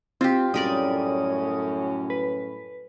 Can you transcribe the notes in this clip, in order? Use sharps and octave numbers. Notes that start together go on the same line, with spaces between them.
C4 F4 G4
F#2 A2 G3 C#4 A#4 D5 D#6
B4